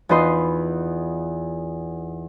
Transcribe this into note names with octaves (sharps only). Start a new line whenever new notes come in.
E2 D#4 F4 B4 D#5 C6